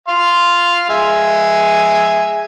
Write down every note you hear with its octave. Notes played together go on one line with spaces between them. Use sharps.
F5 C6
G#3 E5 G#5